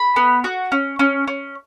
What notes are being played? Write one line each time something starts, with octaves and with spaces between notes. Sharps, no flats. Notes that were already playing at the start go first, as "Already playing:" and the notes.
Already playing: B5
B3
F#4
C#4
C#4
C#4